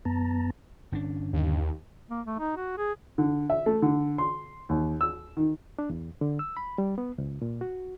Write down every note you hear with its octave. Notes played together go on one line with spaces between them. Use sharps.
F#2 B3 A5 A#5
G1 C#4 D4
D#2
A#3
A3
D#4
F#4
G#4
D3
E5
A3
D3
C6
D#2
E6
D#3
D4
E2
D3
E6
B5
G3
B3
C#2
A#2
F#4